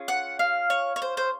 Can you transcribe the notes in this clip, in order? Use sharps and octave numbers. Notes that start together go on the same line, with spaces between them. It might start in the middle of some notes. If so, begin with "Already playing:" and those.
Already playing: C#4 F4 G#4
F#5
F5
C#5
C#5
C5
C5